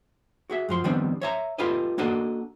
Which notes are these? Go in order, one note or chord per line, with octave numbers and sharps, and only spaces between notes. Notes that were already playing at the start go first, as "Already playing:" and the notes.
F#4 G#4 E5
F#2 F3 C6
D#3 F3 G3 B3 C4 D4
C#5 E5 A#5
F4 G4 A4 B4 D#5
A#3 D4 F#4 A4 D#5